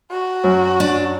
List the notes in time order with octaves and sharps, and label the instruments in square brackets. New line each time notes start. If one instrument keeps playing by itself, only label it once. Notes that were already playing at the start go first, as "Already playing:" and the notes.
[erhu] F#4
[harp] F#2
[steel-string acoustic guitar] D4